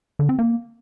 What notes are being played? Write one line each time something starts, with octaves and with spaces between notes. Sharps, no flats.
D3
C4
A#3